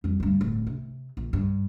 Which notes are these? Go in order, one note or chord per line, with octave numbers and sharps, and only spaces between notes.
F2 G3
D2 G2
D1
C3
A#1
G2